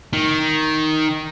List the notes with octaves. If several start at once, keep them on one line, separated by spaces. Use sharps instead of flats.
D#3